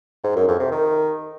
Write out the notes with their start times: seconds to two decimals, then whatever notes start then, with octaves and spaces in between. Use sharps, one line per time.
0.24 G#2
0.36 F#2
0.48 F2
0.60 C3
0.71 D#3